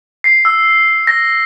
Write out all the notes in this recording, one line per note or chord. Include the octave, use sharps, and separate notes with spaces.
C7
E6
A#6